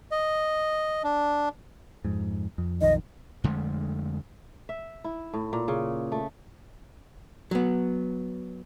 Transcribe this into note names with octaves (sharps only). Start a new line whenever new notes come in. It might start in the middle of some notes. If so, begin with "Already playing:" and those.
D#5
D4
F2 G#2
F2
B1 F2 D#3 D#5
F2 D3 G#3 A3
E5
E4
A2
A#2
C#3
A3
F#3 B3